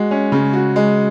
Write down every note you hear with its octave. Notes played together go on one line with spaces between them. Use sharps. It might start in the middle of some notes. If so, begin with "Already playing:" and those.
Already playing: G#3 F#4
C#4
C#3
F#4
G#3